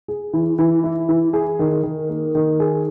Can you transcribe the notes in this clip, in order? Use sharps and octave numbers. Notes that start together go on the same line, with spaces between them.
G#4
E3
E3
E4
E3
G#4
D#3
D#3
A#3
D#3
G#4